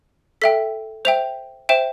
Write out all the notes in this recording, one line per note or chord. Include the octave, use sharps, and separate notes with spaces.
A4 E5 G5 B6
C5 E5 G5 F7
C5 E5 G5 E7